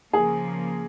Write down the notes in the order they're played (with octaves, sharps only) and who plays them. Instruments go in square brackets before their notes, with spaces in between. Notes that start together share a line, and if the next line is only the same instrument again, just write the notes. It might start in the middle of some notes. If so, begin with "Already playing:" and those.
[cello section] C#3 F3 A#3 [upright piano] G#4